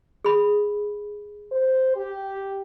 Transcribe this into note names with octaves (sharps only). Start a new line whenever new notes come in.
G#4 B5
C5
G4